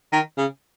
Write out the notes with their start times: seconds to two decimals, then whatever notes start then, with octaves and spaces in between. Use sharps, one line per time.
0.12 D#3
0.38 C#3